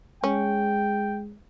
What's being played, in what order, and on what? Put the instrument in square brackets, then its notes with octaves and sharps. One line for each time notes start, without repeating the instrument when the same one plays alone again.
[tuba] G#3 [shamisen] C#4 [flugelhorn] G5